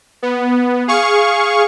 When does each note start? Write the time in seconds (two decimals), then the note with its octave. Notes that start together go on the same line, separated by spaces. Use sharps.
0.22 B3
0.88 G#4 F5 C#6